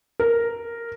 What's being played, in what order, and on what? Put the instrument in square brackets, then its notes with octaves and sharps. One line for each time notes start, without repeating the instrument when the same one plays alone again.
[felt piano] A#4